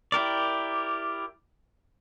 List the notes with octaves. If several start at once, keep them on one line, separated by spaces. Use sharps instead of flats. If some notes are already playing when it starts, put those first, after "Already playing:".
E4 G4 A#4 D5